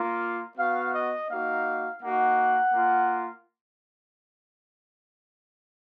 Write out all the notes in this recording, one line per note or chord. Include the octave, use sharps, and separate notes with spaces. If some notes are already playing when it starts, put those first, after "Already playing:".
Already playing: A#3 F4
B3 F#4 F5
D#5
A#3 D#4 F#4 F5
A#3 D#4 F#4 F#5
A#3 F4